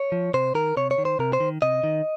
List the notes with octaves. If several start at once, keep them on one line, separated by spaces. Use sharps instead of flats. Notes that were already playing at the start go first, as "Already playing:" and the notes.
Already playing: C#5
F3
C3 C5
D#3 A#4
C3 C#5
C#5
D#3
C5
C3 A#4
C5
D#3
C3 D#5
D#3